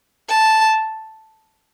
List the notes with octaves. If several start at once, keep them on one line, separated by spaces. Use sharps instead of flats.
A5